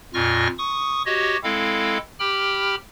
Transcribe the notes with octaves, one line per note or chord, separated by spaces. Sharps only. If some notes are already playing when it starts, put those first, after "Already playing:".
F2 A#2 F4 C#6 F6 A#6
C#6 D#6
F#4 G4 C#5 D#5
G#3 C4 E4 A4 F5
G4 G5 B5 F6